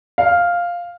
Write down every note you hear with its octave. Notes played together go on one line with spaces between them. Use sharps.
F5